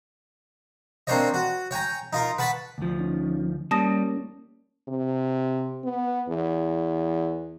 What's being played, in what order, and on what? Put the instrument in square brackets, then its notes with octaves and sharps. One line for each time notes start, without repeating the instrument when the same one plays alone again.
[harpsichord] A#3 C4 D4 C5 C#5 D#5
F#4
C#5 G5 G#5 A#5
D#4 F4 A#4
B4 F#5 A5 B5 C#6
[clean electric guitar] D2 F3
[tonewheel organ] C#4 D#4
[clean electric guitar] G3 [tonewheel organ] A#3 C#4 [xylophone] A5 D#6 A#6
[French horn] C3
B3
E2